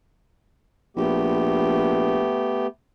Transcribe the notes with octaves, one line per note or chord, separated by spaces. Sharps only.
A#1 A3 B3 G4